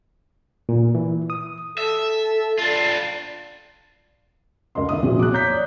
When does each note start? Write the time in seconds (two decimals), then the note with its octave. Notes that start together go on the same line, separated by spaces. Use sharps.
0.69 A#2
0.95 E3
1.30 D#6
1.78 A4 E5
2.58 D4 F4
4.75 C#2 A#4 D#5 C6
4.89 D#3 E5 D#6
5.02 A#2 F3 C4 F#4 G#4
5.19 D6 F#6
5.32 C#5 A#5 G6 B6
5.51 D5